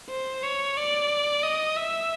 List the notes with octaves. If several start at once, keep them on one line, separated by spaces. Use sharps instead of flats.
C5
C#5
D5
D#5
E5